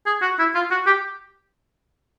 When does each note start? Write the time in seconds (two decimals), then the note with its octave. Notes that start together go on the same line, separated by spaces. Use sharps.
0.06 G#4
0.22 F#4
0.39 E4
0.55 F4
0.71 F#4
0.86 G4